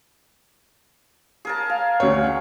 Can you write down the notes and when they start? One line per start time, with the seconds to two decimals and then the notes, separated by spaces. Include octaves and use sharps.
1.45 G#4 A#4 A5
1.70 F5
2.00 D2 C#5